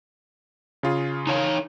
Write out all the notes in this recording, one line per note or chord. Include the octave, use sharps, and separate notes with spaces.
C#3 F4 G#4
D#4 C#5 F5